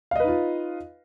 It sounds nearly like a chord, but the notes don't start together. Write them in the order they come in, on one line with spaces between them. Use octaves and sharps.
F5 D#5 B4 D#4 F4